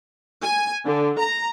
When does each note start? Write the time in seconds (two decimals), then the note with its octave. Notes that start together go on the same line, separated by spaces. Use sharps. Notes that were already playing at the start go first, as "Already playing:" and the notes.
0.42 G#5
0.85 D3
1.19 A#5